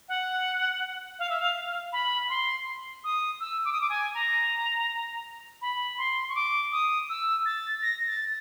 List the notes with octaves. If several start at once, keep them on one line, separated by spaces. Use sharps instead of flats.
F#5
F5
E5
F5
F5
B5
C6
D#6
E6
D6
D#6
D6
G#5
A#5
B5
C6
C#6
D6
D#6
E6
A6
A#6
A6